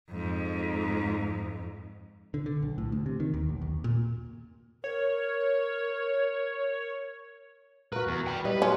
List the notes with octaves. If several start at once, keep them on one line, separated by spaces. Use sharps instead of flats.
F2 G#2
D3
D3
B1
A2
D2
C3
D#3
D#2
B1
D#2
A#2
A#4 C#5
F#4 A#4 B4
E2
G5 B5
G3 E4 B4 D#5
F#3 C4 C#4